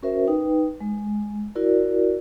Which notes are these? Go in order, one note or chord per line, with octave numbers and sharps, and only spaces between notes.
C#4 F#4 A#4 C5 E5
D#4 B4 G5
G#3
E4 F#4 A#4 D5